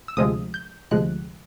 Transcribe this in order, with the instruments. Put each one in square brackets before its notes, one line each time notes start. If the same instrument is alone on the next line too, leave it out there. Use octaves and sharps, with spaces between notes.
[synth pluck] E6
D2 C3 F3 G#3 D#6
G6
D2 C3 F3 G#3 F#6